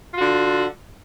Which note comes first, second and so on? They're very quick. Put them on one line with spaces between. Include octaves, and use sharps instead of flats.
F4 F#4 D3